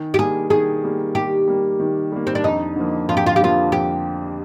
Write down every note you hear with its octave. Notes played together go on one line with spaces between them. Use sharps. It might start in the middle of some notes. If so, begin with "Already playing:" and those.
Already playing: D#3
G4
G3 A#3 G#4
D#3 G#4
G3 A#3
D#3 G4
G3 A#3
D#3
G3 A#3
C4
D4
F2 D#4
D3 F3 A#3
F2 F4
G4
F4
G4
D3 F3 A#3 F4
F2 G4